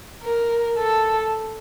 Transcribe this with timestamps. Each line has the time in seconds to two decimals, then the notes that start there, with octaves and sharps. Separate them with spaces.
0.23 A#4
0.78 A4